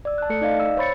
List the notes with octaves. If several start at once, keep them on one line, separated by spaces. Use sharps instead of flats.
D5 E6
A5 F#6
A3 A4 C#7
D#4 D5 D#5 F5
E6
C5 C#5 B5 A6 C#7